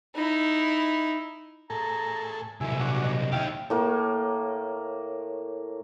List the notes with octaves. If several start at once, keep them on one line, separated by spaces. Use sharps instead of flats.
D#4 E4
A2 G#4 A4 A#5
C2 F#3 E4 G#5
D4 F#4 C#5
D#5
D#4 E4 G4 F5 G5
A2 A#3 C#5